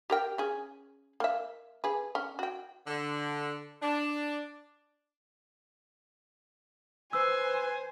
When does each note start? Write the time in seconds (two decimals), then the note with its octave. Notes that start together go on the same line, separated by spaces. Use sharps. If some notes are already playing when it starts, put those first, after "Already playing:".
0.10 G4 A#4 G5
0.38 C#4 G#4
1.20 A#3 E5
1.84 G#4 B4
2.15 C#4
2.39 F#4 G5
2.87 D3
3.83 D4
7.13 B4 C5 G#5 E6